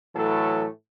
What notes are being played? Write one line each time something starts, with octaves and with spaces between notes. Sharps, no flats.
A2 E3 F#3 A3 A4